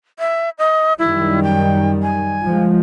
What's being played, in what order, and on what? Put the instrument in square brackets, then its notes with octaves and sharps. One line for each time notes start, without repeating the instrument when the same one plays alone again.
[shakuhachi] E5
D#5
[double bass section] F#2 D#3 G3 [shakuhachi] E4
[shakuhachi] G5
G#5
[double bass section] F3 G#3